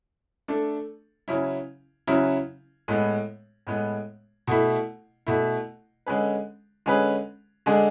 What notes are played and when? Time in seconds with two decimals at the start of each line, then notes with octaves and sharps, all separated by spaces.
0.48 A3 D4 A4
1.28 C#3 F#3 C#4 E4
2.07 C#3 F#3 C#4 E4
2.88 A2 G#3 B3
3.67 A2 G#3 B3
4.47 B2 A3 E4
5.27 B2 A3 E4
6.07 D3 G#3 C#4 G#4 B4
6.86 D3 G#3 C#4 G#4 B4
7.66 D3 G#3 D4 G#4